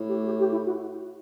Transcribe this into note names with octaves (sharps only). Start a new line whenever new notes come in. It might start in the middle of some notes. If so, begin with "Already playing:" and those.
Already playing: A2
G4
G4
G4
E4
F#4